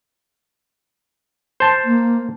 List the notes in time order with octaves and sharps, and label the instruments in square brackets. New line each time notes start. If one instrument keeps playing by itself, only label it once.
[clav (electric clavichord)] C5 A5
[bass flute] A#3